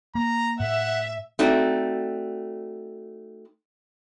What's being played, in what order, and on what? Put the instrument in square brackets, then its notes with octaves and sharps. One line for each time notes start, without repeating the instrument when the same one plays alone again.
[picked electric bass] A#3 [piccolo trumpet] A#5
[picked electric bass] A2 [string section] E5 [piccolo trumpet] F#5
[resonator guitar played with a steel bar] A3 C4 D#4 F#4 D5